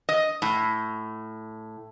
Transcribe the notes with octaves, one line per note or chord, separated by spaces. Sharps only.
D#5
A2